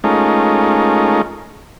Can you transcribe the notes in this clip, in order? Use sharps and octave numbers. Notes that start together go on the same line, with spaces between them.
G#3 A3 C#4 D#4 F4 A#4